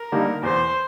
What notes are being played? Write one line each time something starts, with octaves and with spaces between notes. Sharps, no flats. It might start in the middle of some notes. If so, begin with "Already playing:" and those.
Already playing: A#4
D3 G3 A#3 D#4
E2 C5